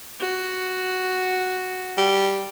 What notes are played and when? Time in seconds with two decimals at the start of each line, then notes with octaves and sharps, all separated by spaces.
0.19 F#4
1.97 G3